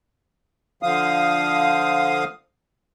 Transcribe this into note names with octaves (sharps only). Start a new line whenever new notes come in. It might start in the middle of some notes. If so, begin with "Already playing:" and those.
D3 F3 F5 D#6